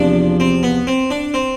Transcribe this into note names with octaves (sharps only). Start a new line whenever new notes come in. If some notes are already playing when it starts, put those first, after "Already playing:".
Already playing: E2 C3 F3 D4
C4
B3
C4
D4
C4